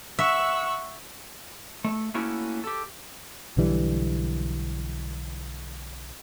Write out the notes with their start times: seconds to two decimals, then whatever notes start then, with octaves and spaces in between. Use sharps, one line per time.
0.19 E5 F#5 C#6 E6
1.84 A3
2.14 A3 A#3 C#4 E4 F#4
2.64 G4 A4
3.57 B1 D3 E3 G3